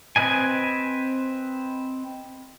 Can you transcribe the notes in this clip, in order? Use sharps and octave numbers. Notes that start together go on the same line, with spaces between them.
C4 B4 D#5 G#5